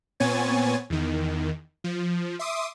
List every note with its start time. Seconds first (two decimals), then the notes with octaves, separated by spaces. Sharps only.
0.20 A#2 B3 C4 C#5 G#5 A6
0.90 E2 D#3
1.84 F3
2.39 E5 C6 D6 D#6